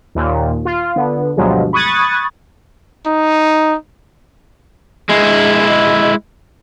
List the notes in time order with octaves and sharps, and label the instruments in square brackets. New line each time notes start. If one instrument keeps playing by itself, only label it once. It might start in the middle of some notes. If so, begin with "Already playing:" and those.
[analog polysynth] D#2 A#2
F4
D3 B3
D2 G2 B2 F3 F#3 G#3
B5 C#6 D#6 F#6 G#6 A6
[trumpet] D#4
[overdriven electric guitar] G#3 E4